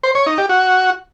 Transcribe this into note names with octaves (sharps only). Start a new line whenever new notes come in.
C5
C#5
D#4
G4
F#4